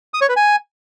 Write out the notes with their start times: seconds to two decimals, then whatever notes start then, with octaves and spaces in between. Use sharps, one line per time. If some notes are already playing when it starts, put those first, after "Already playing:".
0.14 D#6
0.21 C#5
0.29 B4
0.36 G#5